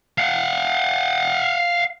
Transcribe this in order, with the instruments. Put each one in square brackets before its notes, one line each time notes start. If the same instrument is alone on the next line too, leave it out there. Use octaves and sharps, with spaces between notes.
[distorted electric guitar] F5 F#5